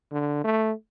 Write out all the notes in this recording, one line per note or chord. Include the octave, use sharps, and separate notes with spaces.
D3
A3